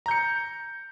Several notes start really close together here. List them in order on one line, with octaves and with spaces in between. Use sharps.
A#5 G6 C#7